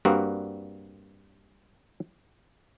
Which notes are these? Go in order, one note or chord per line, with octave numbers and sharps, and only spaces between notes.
G2 G3 A#3 C4 F#4